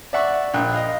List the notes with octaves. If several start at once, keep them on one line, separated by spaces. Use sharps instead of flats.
D5 E5 F#5 C#6
A#1 G5 F#6
D#5 F5